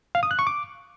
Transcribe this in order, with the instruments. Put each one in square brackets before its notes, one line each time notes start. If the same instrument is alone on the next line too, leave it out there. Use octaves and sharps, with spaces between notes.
[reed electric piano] F5
D#6
F#6
C#6
D6